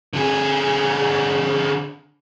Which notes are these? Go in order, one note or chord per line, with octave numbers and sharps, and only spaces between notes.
D3 G#4